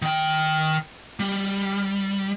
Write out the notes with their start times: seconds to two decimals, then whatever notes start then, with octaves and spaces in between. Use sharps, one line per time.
0.02 D#3 G5
1.20 G3